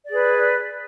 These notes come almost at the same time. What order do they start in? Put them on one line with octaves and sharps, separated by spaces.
D5 G#4 B4